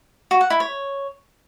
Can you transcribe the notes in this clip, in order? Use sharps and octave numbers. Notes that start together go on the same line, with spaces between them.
F#4
F#5
E4
C#5